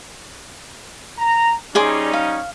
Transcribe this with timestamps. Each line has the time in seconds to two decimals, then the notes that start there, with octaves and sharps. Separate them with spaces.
1.19 A#5
1.75 G3 C#4 D#4 G#4 D5 C6
2.13 F5